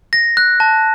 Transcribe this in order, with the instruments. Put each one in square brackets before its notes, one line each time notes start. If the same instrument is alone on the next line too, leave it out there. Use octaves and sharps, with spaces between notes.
[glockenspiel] A#6
F#6
A5